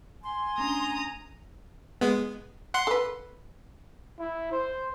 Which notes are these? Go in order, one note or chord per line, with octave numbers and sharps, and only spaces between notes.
G#5 C6
A3 C#4 D4 A#5 D#6
G#3 B3
F#5 C6
A4 B4
E4
C5